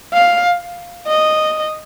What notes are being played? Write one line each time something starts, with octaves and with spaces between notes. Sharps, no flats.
F5
D#5